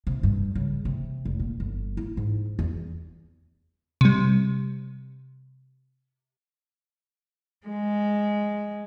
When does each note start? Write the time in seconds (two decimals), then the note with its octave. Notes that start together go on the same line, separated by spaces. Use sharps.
0.07 C3
0.23 G2
0.55 C#3
0.85 C3
1.25 F1
1.39 A#2
1.60 G1
1.97 E4
2.17 G#2
2.59 E2
4.01 C3 G3
7.66 G#3